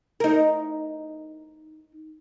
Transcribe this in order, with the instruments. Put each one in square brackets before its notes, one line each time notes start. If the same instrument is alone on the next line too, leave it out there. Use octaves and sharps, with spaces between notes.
[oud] D#4 A#4